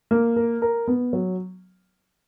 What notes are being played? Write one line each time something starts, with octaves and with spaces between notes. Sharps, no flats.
A#3
A#4
A#4
B3
F#3